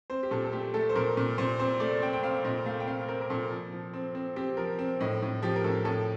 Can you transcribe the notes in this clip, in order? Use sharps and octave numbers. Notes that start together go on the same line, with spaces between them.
C4 C5
G4
A#2 A4
A4
A3 G4
A3 A4
C5
A#2 A#4
A#2
A#2 C5
C4 C5
A3 D5
C4 G5
G5
C4 F5
A#2 D#5
A3 F5
G5
C4 F5
C4 A#4
A#4
A#2 A4
F3
F3
C4
C4
C4 G4
F3 A#4
C4
A2 D#5
A2
F3 G4
A#4
A2 A4
A2 A4